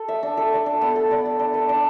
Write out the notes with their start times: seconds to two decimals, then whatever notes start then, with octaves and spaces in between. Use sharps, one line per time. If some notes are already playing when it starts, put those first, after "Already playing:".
Already playing: A4
0.08 E5
0.23 D4
0.37 A4
0.53 D5
0.66 D4
0.81 B3
0.96 A4
1.11 D5
1.25 D5
1.39 D4
1.54 B4
1.69 D4